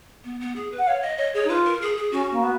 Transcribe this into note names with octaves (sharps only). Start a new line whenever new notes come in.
B3
B3
G#4
B4
F#5
C#5 F5
D#5
C#5 D#5
G#4 C#5
D#4
F4 B4
A#4
G#4
G#4
C#4 F#4
A#3
B3